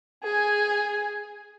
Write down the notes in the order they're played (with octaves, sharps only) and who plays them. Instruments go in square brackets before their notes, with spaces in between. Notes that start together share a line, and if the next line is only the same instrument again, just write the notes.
[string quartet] G#4 G#5